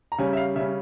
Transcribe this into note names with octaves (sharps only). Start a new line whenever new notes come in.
A#5
C#3 G3 C#4 G#5
E5
F5
C#3 G3 C#4 E5